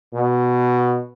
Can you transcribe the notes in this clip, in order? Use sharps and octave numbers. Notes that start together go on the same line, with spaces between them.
B2